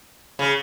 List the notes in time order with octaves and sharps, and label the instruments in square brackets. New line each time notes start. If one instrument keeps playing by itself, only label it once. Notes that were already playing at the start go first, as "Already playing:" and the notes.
[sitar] C#3